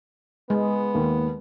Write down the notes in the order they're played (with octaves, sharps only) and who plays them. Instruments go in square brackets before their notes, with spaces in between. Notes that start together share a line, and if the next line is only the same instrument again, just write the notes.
[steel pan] G#3 [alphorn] B3
[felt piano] D#2